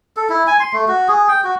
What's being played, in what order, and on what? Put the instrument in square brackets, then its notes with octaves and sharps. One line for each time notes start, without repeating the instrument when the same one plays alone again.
[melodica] A4
E4
G#5
C6
A3
F#4
G#4
G5
F#4